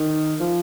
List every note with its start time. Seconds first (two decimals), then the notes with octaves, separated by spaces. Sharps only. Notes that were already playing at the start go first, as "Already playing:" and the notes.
Already playing: D#3
0.40 F3